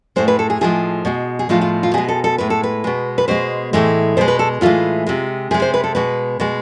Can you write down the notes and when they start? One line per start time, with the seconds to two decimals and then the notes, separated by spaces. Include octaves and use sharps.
0.16 A2 G#3 C5
0.28 B4
0.39 A4
0.50 G#4
0.61 A2 F3 G#3 G#4
1.05 B2 G#3
1.39 G#4
1.49 A2 F3 G#3 F4
1.61 F4
1.83 F4
1.94 B2 G#3 G#4
2.08 A4
2.24 A4
2.38 A2 G#3 B4
2.50 A4
2.63 B4
2.84 B2 G#3
3.18 B4
3.28 B2 G#3 C5
3.73 A2 E3 G#3
4.17 B2 G#3 C5
4.28 B4
4.39 A4
4.61 A2 E3 G#3 F4
5.07 C3 G#3
5.51 C3 G#4
5.54 G#3
5.62 C5
5.74 B4
5.84 A4
5.95 B2 G#3 B4
6.40 B2 G#3